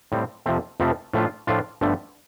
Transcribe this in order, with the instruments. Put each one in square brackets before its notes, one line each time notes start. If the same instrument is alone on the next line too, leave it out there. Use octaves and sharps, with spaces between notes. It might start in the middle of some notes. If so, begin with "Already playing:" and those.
[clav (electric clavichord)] A2 G3 C4
F2 C3 F3 A3 C4
F2 C3 F3 A3 C4
A2 F3 A3 D4 F4
A2 F3 A3 D4 F4
G1 G2 D3 F3 A3